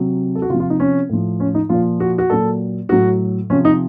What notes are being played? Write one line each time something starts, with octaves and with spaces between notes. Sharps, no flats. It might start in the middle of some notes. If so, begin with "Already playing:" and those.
Already playing: C3 F#3
A4
F#4
C3 F3 F4
F4
D#4
C#4
A2 F3
C#4
D#4
A#2 F3 F4
F#4
F#4
A#2 F#3 A4
A2 F#3 F#4
C3 F3 C#4
D#4